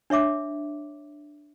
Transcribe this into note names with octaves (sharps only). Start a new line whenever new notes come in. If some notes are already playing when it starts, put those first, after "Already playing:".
D4 C#5 E5 D6